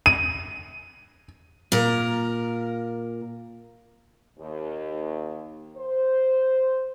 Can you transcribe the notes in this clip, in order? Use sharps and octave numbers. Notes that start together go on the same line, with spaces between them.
D#7
A#2 A#4
D#2
C5